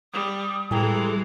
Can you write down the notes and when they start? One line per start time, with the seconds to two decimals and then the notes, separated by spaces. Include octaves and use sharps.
0.13 G3 D#6
0.71 A2 E3 G3 G#3 A4 G5 A#5